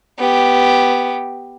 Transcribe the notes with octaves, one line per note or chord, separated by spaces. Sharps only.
B3 G4